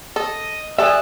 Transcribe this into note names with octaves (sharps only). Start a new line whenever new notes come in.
A4 D#5
G3 A4 D5 E5 G#5 D#6 F#6